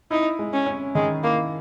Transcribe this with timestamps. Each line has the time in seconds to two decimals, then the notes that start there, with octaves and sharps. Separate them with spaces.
0.11 D#4 E4
0.39 G#3
0.53 C#4
0.66 C#4
0.95 D#3 G#3
1.23 A#3 E4